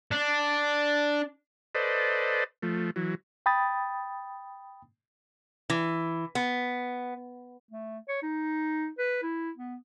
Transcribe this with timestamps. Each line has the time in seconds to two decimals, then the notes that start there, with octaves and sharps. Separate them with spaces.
0.11 D4
1.75 A4 B4 C5 D5 D#5
2.62 F3 A3
2.96 E3 F#3
3.46 G5 B5 D#6 A6
5.70 E3
6.35 B3
7.71 A3
8.08 C#5
8.22 D#4
8.98 B4
9.23 E4
9.57 B3